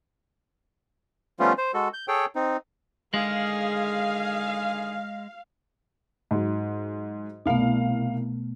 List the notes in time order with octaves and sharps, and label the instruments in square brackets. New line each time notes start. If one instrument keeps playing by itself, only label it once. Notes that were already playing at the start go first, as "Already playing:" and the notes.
[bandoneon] F3 G3 A3 B3 C#4 F4
C5
G#3 F#4 A4
G6
G#4 A4 C#5 G5
C4 D#4
[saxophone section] D3 D#3 G#4 [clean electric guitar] G#3 [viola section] F5
[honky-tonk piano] G#2 F#3
[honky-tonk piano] C2 F5 [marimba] B2 A3 B3